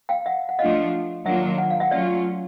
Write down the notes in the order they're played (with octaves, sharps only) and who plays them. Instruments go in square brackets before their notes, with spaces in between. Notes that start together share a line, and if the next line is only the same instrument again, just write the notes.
[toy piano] F5 G5
E5 F#5
F#5
[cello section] F3 A3 D4 F4 [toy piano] D#5 F5
[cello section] D#3 F#3 A#3 D4 F4 [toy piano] E5 F#5
[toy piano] F#5
F5
E5 F#5
[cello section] F#3 A3 C#4 F4 [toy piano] D5 E5